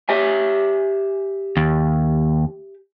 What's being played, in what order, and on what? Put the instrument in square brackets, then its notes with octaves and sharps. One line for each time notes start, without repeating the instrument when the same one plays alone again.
[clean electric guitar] G4 E5 G#5
[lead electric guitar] D#2